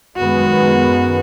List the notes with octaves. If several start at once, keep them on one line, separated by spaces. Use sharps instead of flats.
F#2 D#3 G#3 B3 F#4